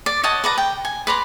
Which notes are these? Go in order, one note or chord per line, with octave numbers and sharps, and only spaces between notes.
D5
C#5 D#5 F#5 A5
B4 D5 A#5
G5
G#5
B4 D5 A#5 C6